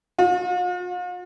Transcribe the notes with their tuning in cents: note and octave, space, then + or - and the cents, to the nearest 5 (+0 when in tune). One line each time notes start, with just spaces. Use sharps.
F4 +45